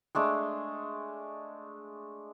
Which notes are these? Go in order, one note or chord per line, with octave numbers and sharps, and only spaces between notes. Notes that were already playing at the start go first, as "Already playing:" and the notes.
G#3 A3 D4